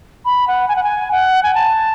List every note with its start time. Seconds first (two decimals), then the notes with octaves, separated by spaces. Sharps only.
0.25 B5
0.48 F#5
0.68 G#5
0.76 F#5
0.83 G#5
1.11 F#5
1.43 G#5
1.55 A5